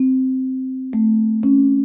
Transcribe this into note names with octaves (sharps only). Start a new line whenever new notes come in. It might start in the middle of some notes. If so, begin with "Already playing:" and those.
Already playing: C4
A3
C#4